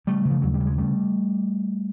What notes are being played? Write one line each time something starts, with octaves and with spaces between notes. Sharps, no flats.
C#3 G3 A3
C#3
F3
D#2 F#3
G3
C#3
G#3
C#3 G3 A3